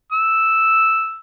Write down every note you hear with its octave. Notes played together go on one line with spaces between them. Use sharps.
E6